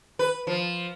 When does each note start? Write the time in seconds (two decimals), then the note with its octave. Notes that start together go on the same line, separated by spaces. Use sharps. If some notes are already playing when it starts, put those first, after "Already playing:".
0.19 B4
0.47 F3